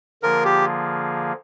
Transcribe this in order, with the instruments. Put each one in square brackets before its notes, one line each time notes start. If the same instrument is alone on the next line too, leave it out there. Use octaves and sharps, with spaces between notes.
[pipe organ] D3 F3 A#3 F4 G#4 [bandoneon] A#4
[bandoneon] G4